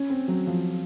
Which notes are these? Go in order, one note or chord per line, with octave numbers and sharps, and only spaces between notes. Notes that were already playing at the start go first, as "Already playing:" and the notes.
Already playing: C#4
C4
F#3
F3